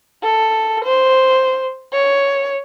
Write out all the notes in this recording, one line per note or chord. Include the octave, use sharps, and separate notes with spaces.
A4
C5
C#5